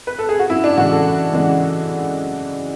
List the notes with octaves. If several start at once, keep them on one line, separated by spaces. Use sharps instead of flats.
B4
A4
G#4
F#4
F#2 E4
D4
C#3 E3 G#3 F#4
A4
F#2
C#3 E3 G#3